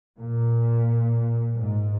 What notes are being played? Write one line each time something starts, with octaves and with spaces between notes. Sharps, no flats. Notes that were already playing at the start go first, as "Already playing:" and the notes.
A#2
G#2